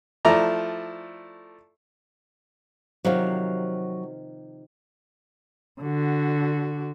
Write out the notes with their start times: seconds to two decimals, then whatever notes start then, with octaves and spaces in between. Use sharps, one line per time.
0.25 F3 A3 E4 D5 A#5
3.05 C3 D#3 F3 F#3 F5
5.81 D3 F#4